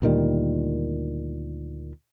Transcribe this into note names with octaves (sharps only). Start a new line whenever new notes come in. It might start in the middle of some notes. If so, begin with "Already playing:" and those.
D2 A#2 D#3 G3